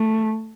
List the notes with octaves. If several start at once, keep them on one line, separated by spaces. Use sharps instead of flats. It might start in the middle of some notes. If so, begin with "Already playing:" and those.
Already playing: A3